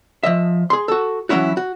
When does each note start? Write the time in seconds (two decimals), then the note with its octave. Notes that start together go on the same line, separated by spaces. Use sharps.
0.23 F3 D#5 E5
0.70 G#4 C6
0.88 F#4 A4
1.29 E3 F#3 A#3 C#4 E4 F#4
1.57 F#4